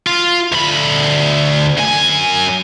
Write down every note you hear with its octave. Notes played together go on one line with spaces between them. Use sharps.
F4
D2 B5
F#2 G#5